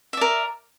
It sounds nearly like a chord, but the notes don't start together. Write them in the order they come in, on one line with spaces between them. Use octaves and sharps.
E5 D5 A#4